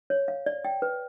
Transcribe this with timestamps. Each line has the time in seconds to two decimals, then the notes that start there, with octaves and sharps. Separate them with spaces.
0.10 C#5
0.28 F5
0.46 D5
0.65 G5
0.82 B4